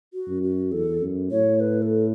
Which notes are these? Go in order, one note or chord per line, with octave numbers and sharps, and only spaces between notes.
F#4
F#2
F#4
E2 A4
F#2
A2 C#5
B4
A4